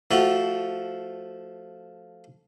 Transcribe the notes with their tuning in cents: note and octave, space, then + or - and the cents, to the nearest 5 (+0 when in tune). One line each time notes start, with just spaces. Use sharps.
F3 +0 A3 +0 F#4 +15